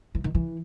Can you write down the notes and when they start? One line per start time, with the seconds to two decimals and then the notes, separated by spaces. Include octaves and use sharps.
0.15 E3
0.24 D#3
0.35 E3